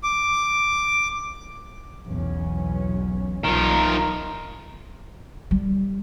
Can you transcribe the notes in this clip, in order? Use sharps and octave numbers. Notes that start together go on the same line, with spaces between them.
D6
B1 E2 C#4
B1 D#3 F4 A#4
G3